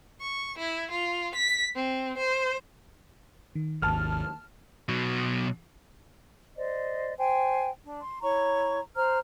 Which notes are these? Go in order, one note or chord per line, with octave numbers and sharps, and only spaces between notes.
C#6
E4
F4
B6
C4
C5
D#3
G#1 D#2 A5 F6
B2 F#3
C5 D5 D#5
C5 G5 G#5
D4
C6
E4 C#5 A#5 C#6
C5 A#5 F6